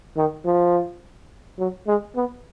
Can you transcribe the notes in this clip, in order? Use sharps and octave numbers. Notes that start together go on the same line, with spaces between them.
D#3
F3
F#3
G#3
B3